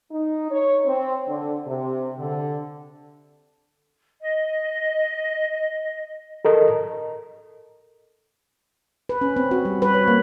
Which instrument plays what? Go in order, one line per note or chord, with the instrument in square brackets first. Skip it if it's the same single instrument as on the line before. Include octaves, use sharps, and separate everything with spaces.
[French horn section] D#4
C#5
C4
D3
C3
D3
[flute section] D#5
[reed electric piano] A4 A#4 D#5
[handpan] B4
C#4
C4
F#4
G3
B4
C#5
A#3